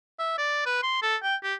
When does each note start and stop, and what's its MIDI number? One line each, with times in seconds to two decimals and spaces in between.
0.19 0.33 76
0.38 0.61 74
0.66 0.82 71
0.83 0.98 84
1.02 1.16 69
1.23 1.36 79
1.43 1.54 67